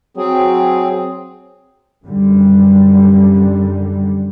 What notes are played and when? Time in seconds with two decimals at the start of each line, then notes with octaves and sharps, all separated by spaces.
0.17 F#3 C4 G#4
2.05 F#2 D3 G3